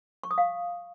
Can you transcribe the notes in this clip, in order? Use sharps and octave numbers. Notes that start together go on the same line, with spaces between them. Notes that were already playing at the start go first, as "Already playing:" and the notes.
C#6
D#6
F5